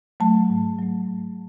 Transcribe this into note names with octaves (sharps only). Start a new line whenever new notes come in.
F#3 A3 A5
G#2
F#3 A3
G#2